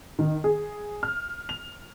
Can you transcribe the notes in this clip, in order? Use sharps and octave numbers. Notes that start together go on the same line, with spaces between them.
D#3
G#4
F6
F7